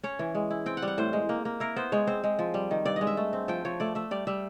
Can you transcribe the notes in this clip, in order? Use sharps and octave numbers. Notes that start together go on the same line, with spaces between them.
C#4 C#5
E3
G#3
E4
C4 G5
F#5
G3
F#5
A2 C5
G#3
A#3
A#3
E4 A#4
B3 C5
G#3 C#5
C4 C5
G#3
F3
G3
D#3
G2 D5
G#3 D#5
E5
A3
C4
F3 G5
F3 C#5
A3 D5
A3 E5
G3 D5
G3 E5